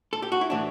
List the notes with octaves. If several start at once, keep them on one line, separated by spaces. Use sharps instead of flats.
A4
G4
F#4
E4
A2 E3 D4